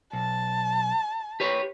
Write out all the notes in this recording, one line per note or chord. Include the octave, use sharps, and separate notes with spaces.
B1 A5
G4 B4 C#5